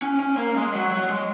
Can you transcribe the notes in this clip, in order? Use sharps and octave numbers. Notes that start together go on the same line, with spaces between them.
C#4
C#4
A#3
G#3
F#3
F#3
G#3